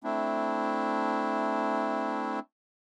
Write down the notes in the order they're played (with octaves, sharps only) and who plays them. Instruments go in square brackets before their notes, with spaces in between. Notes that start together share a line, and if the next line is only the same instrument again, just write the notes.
[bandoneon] A3 C4 D4 E4